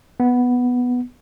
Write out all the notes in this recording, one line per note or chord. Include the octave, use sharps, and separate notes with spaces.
B3